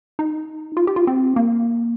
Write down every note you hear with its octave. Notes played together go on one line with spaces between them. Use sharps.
D#4
F4
G4
F4
C4
A#3